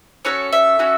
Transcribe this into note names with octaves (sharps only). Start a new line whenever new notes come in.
C#4 F#4 A4 C#5
E5
C#4 F#4 A4